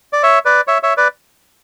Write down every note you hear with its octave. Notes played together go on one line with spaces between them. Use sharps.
D5
C#5 E5
B4 D5
C#5 E5
C#5 E5
B4 D5